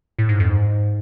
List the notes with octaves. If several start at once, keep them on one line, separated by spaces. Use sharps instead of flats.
A2
G#2
F2
G#2